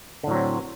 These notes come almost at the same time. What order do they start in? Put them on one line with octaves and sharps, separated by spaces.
D3 A2 F#3 C4